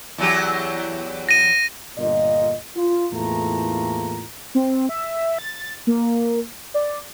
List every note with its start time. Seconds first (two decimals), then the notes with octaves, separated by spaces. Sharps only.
0.18 E2 F#3 G4
1.29 A#6 D#7
1.99 G1 A#2 D#5
2.76 F4
3.13 E2 A2 A3 A#3 F4 A#5
4.55 C4
4.89 E5
5.39 A6
5.87 A#3
6.74 D5